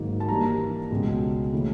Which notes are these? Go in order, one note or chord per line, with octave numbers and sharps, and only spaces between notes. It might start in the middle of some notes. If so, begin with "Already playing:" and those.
Already playing: G#2 D#3 F#3 A#3
A5
G2 E3 G3 A#3 A#5
C#2 B2 G#3
C#3 E3 A3